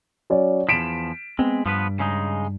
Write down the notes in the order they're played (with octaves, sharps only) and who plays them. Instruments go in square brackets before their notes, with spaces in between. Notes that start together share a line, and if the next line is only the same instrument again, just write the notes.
[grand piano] F#3 C#4 D5
[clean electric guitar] E2 F3 [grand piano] B6 D7 E7
[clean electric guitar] G#3 [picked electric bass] B3 C4
[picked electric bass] G2 [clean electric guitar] F3 B3 B4
[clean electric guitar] C#3 G#3 D#4